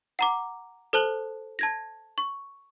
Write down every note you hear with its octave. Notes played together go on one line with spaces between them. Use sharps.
F#5 A#5 D6
A4 C5 A5 F#6 F#7 G7
A5 G#6 A#6
C#6